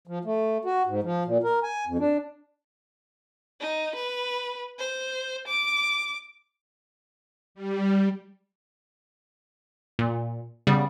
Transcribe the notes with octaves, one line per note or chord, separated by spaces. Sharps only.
F3
A3
F#4
G#2
F3
A#2
A#4
G#5
F2
D4
D#4
B4
C5
D6
G3
A#2
C#3 G3 B3